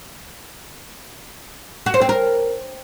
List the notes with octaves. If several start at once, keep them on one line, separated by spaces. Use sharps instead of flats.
F#4
C5
C4
A#4